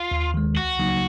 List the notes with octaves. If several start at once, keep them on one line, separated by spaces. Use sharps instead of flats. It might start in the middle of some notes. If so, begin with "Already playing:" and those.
Already playing: F4
D#2
D#3 G#3
C#2 F#4
C#3 F#3 A#3 D#4